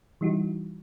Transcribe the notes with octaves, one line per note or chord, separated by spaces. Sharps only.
E3 G3 D#4 E4 F#4